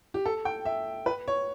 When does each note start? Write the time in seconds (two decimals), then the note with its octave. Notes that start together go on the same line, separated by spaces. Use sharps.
0.14 G4
0.26 A4
0.45 G5
0.65 E5
1.06 B4
1.28 C#5